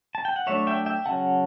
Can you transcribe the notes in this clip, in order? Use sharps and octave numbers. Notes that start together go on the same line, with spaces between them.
A5
G5
F#5
F#3 A3 D4 C#5 E5
E5 G5
E5 G5
C#3 F#3 C#4 F#5 A5